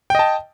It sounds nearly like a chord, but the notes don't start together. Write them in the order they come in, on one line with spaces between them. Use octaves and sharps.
G5 D#5 A5